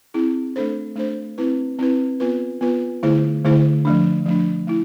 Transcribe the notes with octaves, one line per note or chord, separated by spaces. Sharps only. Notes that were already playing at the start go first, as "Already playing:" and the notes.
C4 E4 G#4
A3 D4 A4 C5
A3 D4 A4 C5
C4 E4 B4
C4 E4 B4
B3 F4 B4
B3 F4 B4
D3 A3 E4 G#4 C5
D3 A3 E4 G#4 C5
F3 A3 D4
F3 A3 D4
A3 E4